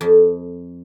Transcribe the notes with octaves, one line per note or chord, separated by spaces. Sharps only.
F2